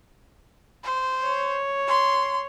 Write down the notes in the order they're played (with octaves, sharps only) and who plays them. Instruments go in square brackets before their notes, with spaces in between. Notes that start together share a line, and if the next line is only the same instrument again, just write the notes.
[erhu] C5
[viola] C#5
[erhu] C6